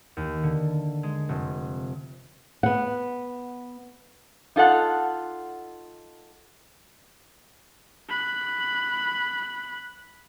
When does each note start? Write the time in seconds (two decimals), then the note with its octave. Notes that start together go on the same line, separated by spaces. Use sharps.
0.17 D#2
0.43 D3
1.03 G#3
1.29 F1
2.63 B3 F#5
4.56 D#4 F4 A4 F#5
8.09 B5 F#6